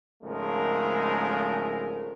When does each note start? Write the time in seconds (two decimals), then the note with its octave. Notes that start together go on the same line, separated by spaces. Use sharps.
0.23 G#1 C#3 F3 G#3 A3 A#4